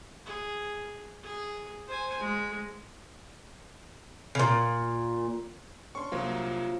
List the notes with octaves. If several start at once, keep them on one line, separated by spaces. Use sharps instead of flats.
G#4
G#4
C5 G#5
G#3
A#2 C#3
C#4 D4 C6 C#6
C2 F#3 A#3 F4 C5 A#5